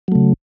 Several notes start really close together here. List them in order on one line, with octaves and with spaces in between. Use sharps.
F#3 A3 C#3